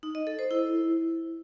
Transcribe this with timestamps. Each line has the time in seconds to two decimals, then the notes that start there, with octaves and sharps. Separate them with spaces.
0.03 D#4
0.15 D#5
0.27 A4
0.39 C5
0.51 E4